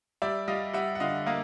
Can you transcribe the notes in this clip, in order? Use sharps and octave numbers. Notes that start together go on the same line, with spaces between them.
G3 D5 E5
G3 D#5 F5
G3 E5 F#5
F#5
D3 D#5 F5
A#3 D#5 F5